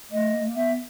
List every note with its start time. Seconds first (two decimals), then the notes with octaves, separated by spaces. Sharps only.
0.12 A3 D#5
0.33 A#3
0.41 A3
0.48 A#3
0.56 B3 E5